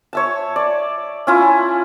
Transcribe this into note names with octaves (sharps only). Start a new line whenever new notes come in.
C#5 E5 A5
D5
C#4 E4 F4